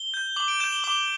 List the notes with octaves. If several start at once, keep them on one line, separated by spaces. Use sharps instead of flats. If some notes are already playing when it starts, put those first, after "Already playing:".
Already playing: G7
G6
D6 F#7
D7
G6 E7
G7
D6 G7